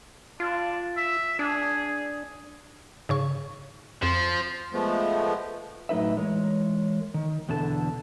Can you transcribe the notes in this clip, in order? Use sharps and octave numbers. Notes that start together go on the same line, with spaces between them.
D4 F4
E5
D4 G#4
G#2 C#3 C#6
F2 F3
F3 G#3 A3 B3
A2 F#3 D#4 B4 E5
E3 G#3 A#4 C#5
D#3
E2 B2 D3 A4 A5